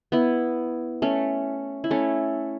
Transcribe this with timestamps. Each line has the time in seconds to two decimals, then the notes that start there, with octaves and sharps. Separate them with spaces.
0.12 B3 E4
1.02 A3 C#4
1.84 E4
1.91 A3 C#4